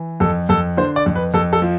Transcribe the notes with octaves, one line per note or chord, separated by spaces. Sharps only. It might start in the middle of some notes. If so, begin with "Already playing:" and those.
Already playing: E3
F2 A4
F2 A4
D3 C5
D5
F2
B4
F2 A4
A4
F3